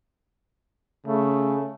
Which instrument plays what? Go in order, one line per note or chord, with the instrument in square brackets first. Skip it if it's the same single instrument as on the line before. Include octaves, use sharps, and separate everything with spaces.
[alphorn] C#3 [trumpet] A3